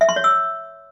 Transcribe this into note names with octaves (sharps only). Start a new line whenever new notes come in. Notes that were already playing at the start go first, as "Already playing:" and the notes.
E5
C6
C#5
E6